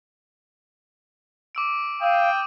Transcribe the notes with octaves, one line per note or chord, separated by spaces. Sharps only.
D6 E6 D7
F5 G5 D#6 E6 D#7